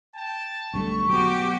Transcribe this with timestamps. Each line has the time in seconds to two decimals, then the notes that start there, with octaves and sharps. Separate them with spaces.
0.15 G5 A5
0.73 B1 G2 D3 A3 C#6
1.09 F#3 B3 F#4 G4 D6